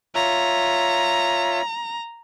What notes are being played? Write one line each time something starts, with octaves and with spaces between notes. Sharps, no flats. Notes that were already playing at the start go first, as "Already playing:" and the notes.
F4 C#5 E5 A#5